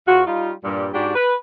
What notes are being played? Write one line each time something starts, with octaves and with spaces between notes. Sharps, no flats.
E2 F4 F#4
G3 D#4 F4
G2 A#2 G3
G#2 D4 F#4 G4
B4